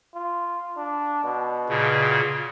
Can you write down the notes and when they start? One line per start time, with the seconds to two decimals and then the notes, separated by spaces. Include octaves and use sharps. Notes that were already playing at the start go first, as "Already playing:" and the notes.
0.15 F4
0.77 D4
1.24 B2
1.69 A#2 C#3